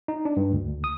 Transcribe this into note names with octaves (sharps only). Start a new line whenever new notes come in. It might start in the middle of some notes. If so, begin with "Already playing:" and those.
D#4
D4
G2
D2
D#6